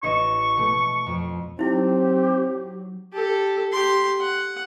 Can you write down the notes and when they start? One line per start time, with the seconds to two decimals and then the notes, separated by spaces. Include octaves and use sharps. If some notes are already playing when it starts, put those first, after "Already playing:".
0.03 A1 D#5 C#6 E7
0.57 B2 A3
1.06 F2
1.59 F#3 C4 D#4 E4 G4
3.13 G4 A4
3.72 G4 C6
4.20 F#5